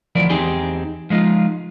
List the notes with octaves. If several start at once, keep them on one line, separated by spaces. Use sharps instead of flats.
D2 E3 F3 A#4 D5
E2 C4 D#4 G4 G#4 C6
F3 G#3 D#4 F4